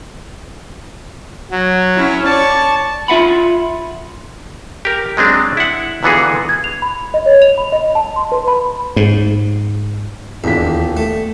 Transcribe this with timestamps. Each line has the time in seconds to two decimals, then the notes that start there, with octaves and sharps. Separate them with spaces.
1.51 F#3
1.95 C#4 E4
2.26 C#5 D5 A5 C#6
3.08 F4 E5 F#5 B5
4.85 G4 A#4
5.17 F#3 G#3 C4 D4
5.57 E4 F#5
6.03 A#2 D3 E3 B3 F#4 G#4
6.49 G#6
6.64 F7
6.82 B5
7.14 D#5
7.26 C#5
7.42 F7
7.58 B5
7.72 D#5
7.95 A5
8.16 C6
8.32 B4
8.48 B5
8.96 G#2
10.44 D#1 E2 D4 B6
10.97 A3